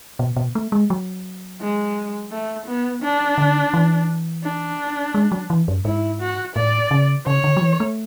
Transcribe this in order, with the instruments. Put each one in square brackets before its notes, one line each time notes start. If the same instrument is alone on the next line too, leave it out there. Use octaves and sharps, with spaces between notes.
[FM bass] B2
B2
A3
G#3
F#3
[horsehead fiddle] G#3
A3
B3
D4
[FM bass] D3
E3
[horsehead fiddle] D4
[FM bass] G#3
F#3
E3
F#2
[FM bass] G#2 [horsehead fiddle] E4
[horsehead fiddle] F#4
[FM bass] A2 [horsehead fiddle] D5
[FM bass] C#3
[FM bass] C#3 [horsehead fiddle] C#5
[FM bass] D3
F#3
E3
A3